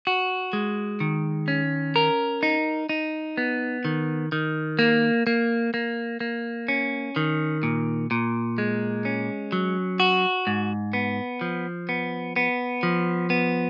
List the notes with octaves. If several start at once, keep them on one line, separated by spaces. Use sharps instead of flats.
F#4
G#3
D#3
C#4
A#4
D#4
D#4
B3
D#3
D#3
A#3
A#3
A#3
A#3
C#4
D#3
A#2
A#2
G#3
C#4
F#3
F#4
G#2
B3
F3
B3
B3
F3
B3